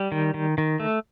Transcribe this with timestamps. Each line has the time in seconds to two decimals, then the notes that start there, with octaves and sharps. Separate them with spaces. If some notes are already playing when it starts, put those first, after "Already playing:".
Already playing: G3
0.12 D#3
0.34 D#3
0.58 D#3
0.80 A3